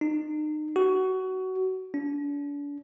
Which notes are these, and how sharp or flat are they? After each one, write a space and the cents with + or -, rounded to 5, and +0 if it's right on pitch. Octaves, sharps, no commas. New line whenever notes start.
D#4 -35
F#4 +20
D4 -40